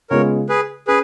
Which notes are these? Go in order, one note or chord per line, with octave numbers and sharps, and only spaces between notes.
C#3 G#3 B3 F4 G#4 A#4 C#5
G#4 B4
C#4 G#4 B4